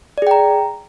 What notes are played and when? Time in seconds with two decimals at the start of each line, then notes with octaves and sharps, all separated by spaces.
0.18 D5
0.22 G#4
0.27 G5
0.31 A#5